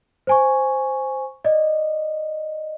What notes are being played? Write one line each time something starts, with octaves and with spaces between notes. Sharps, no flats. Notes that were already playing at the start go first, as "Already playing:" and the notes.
C5 G#5 C#6
D5 D#5